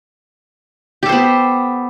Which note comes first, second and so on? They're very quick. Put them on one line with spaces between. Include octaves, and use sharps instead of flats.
G4 A4 C5 B3